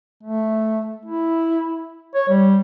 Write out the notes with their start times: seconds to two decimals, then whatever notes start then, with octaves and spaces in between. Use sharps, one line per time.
0.23 A3
1.05 E4
2.14 C#5
2.29 G3